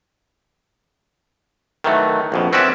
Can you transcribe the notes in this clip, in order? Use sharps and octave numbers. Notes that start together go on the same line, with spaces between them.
D#3 E3 F#3 A3
A#1 F2 B2
C4 C#4 F#4 B4 D5 E5